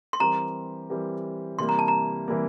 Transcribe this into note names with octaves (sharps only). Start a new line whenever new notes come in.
C6
E3 G3 C4 G4 A#4 A#5
E3 G3 C4 G4 A#4
C3 E3 G3 A#3 C6
A#5
A5
A#5
C3 E3 G3 A#3